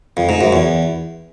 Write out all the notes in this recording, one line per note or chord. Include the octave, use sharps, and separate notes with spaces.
F2
G#2
F#2
E2